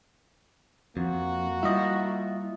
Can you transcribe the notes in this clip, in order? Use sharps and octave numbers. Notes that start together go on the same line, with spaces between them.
F2 A#3 F#4
G3 E4 F4 D#5